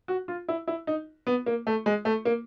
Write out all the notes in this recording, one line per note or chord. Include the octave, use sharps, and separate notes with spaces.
F#4
F4
E4
E4
D#4
B3
A#3
A3
G#3
A3
A#3